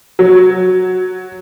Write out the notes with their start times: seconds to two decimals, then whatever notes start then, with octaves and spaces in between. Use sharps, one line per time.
0.19 F#3